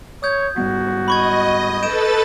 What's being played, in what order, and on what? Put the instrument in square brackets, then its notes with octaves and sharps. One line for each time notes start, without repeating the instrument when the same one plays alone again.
[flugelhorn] C#5 [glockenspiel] D#6 G6 G#6
[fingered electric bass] G#2 G3 B3 [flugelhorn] F#4
[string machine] D#5 [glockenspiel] B5 C#6 G#6
[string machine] A4 B4 A6 [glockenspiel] G6 D7 E7